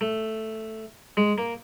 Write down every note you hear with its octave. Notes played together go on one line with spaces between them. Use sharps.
A3
G#3
A#3